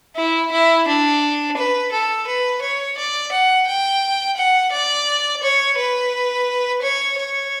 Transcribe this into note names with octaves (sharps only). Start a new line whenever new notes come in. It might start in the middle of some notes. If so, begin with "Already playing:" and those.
E4
E4
D4
B4
A4
B4
C#5
D5
F#5
G5
F#5
D5
C#5
B4
C#5
C#5